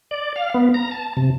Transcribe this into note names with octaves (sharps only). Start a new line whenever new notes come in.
D5
F5
B3
A#5
A5
C3